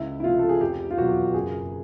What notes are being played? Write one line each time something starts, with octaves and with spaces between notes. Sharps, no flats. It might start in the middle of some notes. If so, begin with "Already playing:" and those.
Already playing: C#2 E4
E4
C3 F3 A3 F4
A4
G#4
F1 G4
F4
E2 B2 F#3 F#4
F#1 G#4